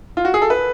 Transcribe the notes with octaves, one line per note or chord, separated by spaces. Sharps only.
F4
F#4
G#4
A4
B4